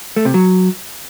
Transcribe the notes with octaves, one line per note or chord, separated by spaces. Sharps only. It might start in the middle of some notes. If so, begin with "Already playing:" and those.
A3
C3
F#3